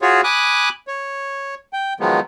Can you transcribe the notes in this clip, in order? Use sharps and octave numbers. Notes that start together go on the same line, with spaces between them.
F4 F#4 G#4 C#5
G#5 B5 D6 D#6 F#6
C#5
G5
D#3 F3 F#3 G#3 B3